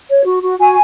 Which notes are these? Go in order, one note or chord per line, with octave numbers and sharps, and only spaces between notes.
C#5
F#4
F#4
F#4 G#5